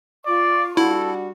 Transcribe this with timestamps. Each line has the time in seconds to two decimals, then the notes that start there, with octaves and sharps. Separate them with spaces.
0.26 F4 D5 C#6
0.77 G3 D4 E4 F#4 A4